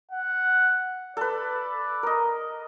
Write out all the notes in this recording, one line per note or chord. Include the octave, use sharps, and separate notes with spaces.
F#5
A4 B4 D5
A#4 D#5